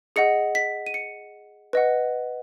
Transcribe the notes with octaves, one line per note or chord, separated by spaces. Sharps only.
G#4 D#5 F#5 C#7
B6
D#7
C#7
B4 D#5 F#5